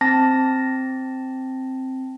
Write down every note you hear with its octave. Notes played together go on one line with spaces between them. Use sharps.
C4 A5 A#6